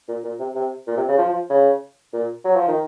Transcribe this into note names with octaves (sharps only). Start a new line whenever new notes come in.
A#2
A#2
C3
C3
A#2
C3
C#3
F3
F3
C#3
A#2
F#3
F3
D#3